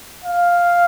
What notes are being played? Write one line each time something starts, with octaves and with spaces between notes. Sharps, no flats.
F5